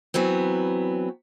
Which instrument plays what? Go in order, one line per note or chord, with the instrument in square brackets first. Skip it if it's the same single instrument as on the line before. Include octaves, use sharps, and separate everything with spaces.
[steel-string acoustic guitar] E3 F#3 B3 C4